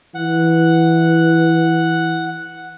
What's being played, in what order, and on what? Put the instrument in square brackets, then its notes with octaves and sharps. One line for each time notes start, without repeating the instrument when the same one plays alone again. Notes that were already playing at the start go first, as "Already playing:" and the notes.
[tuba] E3 [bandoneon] F#5